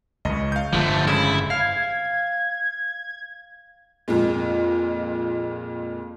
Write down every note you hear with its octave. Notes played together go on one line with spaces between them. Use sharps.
C#2 C#3 D#5
F5 G6
G1 F2 D3 F3 A3
C#3 G#3 E4
F5 G#6
F2 A#2 G#3